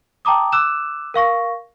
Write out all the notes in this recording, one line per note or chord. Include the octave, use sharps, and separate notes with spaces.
G5 A5 A#5 D6 D#6
D6 E6 F#6 E7
A#4 F5 C#6 A#6